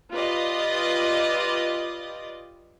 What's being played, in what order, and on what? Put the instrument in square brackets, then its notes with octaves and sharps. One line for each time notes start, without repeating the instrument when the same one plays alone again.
[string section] F4 G4 B4 D5 D#5